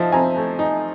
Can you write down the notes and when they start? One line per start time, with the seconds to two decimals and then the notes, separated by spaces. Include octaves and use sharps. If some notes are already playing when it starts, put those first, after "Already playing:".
Already playing: F3 D#4 D#5 E5 A5
0.12 C4 G#5 A#5
0.37 A3
0.59 D#4